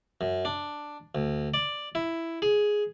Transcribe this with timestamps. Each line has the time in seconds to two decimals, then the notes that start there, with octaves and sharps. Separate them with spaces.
0.21 F#2
0.45 D4
1.15 D2
1.54 D5
1.95 E4
2.42 G#4